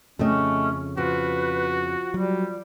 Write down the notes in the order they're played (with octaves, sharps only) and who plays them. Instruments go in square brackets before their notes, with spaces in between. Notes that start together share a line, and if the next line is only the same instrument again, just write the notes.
[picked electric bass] F2 C#3 [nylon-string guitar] A3 G4 D#5 [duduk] C#4
[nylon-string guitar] F3 [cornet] F#4 [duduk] B4
[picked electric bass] F#3 [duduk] G3